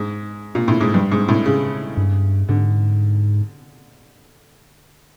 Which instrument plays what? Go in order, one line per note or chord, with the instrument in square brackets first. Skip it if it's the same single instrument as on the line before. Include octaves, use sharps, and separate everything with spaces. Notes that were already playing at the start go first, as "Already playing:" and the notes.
Already playing: [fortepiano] G#2
A#2
A2
G#2
G2
G#2
A2
C#3
[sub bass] G2
[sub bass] G#2 [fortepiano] D3